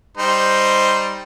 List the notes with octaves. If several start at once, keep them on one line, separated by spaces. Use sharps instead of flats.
G3 D#4 C5